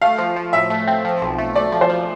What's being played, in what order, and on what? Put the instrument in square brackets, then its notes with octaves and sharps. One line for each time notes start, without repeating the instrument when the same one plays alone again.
[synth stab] A3 [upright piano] F5
[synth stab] F3
F3
[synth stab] A2 [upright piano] E5
[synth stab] A3
C4
F3
B1
A3
[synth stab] A3 [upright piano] D5
[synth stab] F3
[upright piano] C5
[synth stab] F3